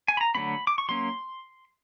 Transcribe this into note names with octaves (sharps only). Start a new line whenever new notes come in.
G#5
B5
A#5
D3 F#3 A3 C4 B5
D6
C#6
F#3 A#3 C#4 C6